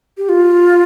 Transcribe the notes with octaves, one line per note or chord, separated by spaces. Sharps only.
G4
F4